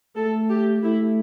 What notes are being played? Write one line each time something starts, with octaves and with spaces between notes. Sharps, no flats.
A3 A4
G4
A3 E4